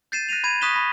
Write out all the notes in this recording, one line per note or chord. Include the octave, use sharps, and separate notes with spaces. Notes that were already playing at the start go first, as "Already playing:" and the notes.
G6 A6 C7 D#7 E7
F#6 A#6 C7 D#7 F7
B5 G#6 D#7
C#6 D#6 F#6 B6 E7 G7
B5 A#6